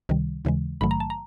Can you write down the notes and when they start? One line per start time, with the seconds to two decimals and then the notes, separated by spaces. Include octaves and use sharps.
0.09 C#2 C3 D#3 G3
0.45 D#2 C#3 E3 G#3
0.81 A#1 G#2 D#3 F#3 A3 B5
0.91 A#5
1.00 A5
1.10 A#5